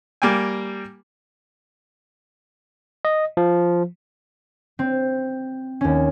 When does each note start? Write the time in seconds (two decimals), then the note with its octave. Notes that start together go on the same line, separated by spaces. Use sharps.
0.22 G3 A#3 G5 G#5
3.05 D#5
3.37 F3
4.79 C4
5.81 D#2 C#4